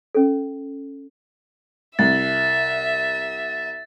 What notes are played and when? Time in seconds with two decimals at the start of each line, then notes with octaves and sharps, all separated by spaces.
0.15 C#4 A4
1.99 C2 E5 A6